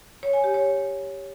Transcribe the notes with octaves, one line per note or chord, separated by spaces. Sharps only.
C#5
G#5
G4
C#5